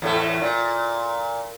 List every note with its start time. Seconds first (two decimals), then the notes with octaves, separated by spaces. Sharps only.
0.02 E2 A2 A3
0.41 A#2